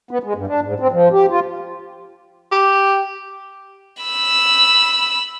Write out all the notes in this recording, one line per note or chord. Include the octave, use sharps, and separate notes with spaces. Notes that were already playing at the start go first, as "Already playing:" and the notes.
B3
G#3
G2
D4
G#2
C4
F3
G4
F4
G4
B5 E6